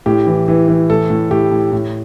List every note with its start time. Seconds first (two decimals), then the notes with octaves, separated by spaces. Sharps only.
0.06 A2 G4
0.27 E3
0.48 E3
0.68 E3
0.89 A2 A4
1.10 A2
1.30 A2 G4
1.51 A2
1.72 A2